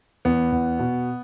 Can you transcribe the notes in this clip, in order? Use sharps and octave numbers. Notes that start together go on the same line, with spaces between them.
E2 B3
E2
B2